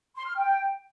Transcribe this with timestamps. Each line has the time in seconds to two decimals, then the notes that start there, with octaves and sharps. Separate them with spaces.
0.16 C6
0.26 F6
0.36 G5